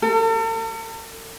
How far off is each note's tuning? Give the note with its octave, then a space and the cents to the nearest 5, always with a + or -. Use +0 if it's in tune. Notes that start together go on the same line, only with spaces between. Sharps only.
A4 +45